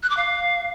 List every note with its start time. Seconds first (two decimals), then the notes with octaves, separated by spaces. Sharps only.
0.03 F#6
0.10 D6
0.17 F5